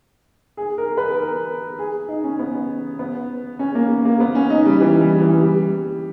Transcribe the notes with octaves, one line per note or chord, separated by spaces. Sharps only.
G#4
A#4
B4
A#4
G#4
D#4
C#4
B3
B3
C#4
A#3
A#3
B3
C#4
D#4
G3
E3
G3
E3
G3